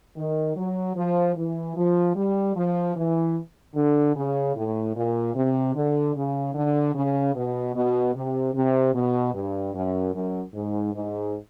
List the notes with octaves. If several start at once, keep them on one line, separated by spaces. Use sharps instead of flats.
D#3
F#3
F3
E3
F3
G3
F3
E3
D3
C#3
A2
A#2
C3
D3
C#3
D3
C#3
B2
B2
C3
C3
B2
G2
F#2
F#2
G#2
G#2